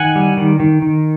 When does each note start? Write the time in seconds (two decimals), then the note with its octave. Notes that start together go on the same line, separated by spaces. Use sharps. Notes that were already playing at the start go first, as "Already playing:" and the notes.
Already playing: D#3 F#5 G#5
0.16 G3
0.37 D#3
0.60 D#3
0.82 D#3